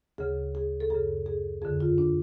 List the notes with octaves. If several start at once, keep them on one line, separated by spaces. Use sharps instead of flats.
D2 C#3 G#4
G#4
A4
F#2 C#3 G#4
G#4
F2 D3 G#4
F4
D4